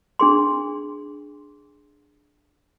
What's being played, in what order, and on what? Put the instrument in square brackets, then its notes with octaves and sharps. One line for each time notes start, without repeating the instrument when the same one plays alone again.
[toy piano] D4 G#4 C6